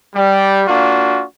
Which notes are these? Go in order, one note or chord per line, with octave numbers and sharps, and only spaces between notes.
G3
A#3 D4 F4 F#4